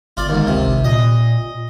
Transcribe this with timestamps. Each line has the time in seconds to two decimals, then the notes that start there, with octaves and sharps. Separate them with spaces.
0.17 G1 F4 D5
0.29 D#2 G#2
0.47 C#2 C3
0.66 G#1
0.84 A#2 D#5